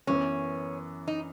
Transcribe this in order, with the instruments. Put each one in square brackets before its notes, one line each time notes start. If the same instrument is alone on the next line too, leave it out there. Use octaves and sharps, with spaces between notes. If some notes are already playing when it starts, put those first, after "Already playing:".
[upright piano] F#2 E3 B3 [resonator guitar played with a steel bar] C#4
[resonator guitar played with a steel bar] D#4